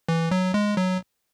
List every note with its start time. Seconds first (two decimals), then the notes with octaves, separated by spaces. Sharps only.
0.09 E3
0.31 F#3
0.54 G#3
0.77 F#3